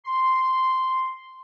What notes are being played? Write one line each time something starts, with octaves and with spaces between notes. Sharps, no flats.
C6